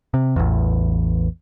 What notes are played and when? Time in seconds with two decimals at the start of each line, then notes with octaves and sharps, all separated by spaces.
0.14 C3
0.36 A1 E2